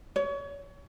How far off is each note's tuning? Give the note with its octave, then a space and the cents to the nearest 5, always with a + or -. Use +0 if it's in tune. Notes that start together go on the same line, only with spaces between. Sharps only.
C#5 +30